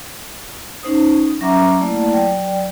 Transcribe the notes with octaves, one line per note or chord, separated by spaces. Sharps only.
C#4 D#4 C5 D#6
F#3 C#4 E5 F#5 A#5 D6
A3 A#3 E4 D5 F#5 A5
F#3 D5 G5